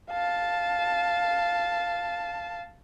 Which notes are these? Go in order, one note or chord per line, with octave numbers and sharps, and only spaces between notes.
F5 A5